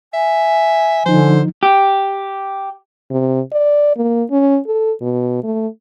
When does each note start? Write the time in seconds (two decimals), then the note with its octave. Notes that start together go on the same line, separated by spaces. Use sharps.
0.14 E5 G#5
1.06 D3 F3 D#4 C5
1.63 G4
3.10 C3
3.52 D5
3.97 A#3
4.31 C#4
4.67 A4
5.01 B2
5.43 A3